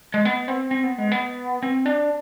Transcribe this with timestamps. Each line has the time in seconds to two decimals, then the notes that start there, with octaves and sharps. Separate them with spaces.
0.14 G#3
0.25 B3
0.48 C4
0.71 C4
0.84 B3
0.98 G#3
1.12 B3
1.63 C4
1.86 D4